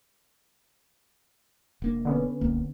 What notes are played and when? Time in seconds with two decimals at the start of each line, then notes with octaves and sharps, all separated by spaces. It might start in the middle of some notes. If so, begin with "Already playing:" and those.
1.82 E1 A#3 D4
2.05 D3 B3 C#4
2.41 D1 C2 A#3